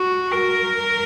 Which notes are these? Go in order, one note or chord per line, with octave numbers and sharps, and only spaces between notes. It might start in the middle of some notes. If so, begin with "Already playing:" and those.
Already playing: F#4
A#4